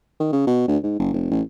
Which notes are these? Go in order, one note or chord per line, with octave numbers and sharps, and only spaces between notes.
D#3
C#3
B2
D2
G#2
F#1
F1
A1